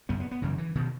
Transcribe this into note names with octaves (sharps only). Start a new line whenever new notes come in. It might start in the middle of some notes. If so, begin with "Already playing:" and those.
F#2 C#3 B3
B3
B3
F#2 C#3 E3
E3
B2 D#3